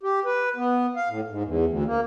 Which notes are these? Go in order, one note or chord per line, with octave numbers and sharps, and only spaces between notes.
G4
B4
B3
F5
A2
G#2
E2
D2
A#3